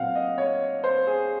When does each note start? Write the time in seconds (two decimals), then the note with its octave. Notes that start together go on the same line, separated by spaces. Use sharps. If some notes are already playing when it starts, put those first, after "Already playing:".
Already playing: A#2 F#3 C4 F5 F#5
0.15 D#5
0.38 C#5
0.84 C5
1.07 G#4